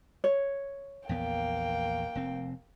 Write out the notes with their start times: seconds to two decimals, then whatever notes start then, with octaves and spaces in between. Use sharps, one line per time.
0.24 C#5
1.09 A#1 E2 A#3 B3 G5
2.15 F1 C4